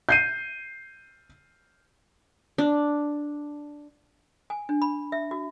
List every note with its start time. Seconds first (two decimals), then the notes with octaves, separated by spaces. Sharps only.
0.09 G6 C7 D#7
2.58 D4
4.50 G#5
4.69 D4
4.82 B5
5.12 E5
5.31 F#4